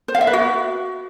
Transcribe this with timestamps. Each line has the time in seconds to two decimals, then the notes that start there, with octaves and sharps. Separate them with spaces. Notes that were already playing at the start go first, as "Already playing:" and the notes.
0.08 C5
0.15 F5
0.21 E5
0.27 B4
0.33 F#4